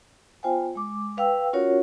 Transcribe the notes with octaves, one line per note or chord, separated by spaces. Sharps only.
B3 F4 C5 F5 G5 G#5
G#3 D6
B4 F5 G5 E6
C#4 F4 F#4 A#4 C#5 F#5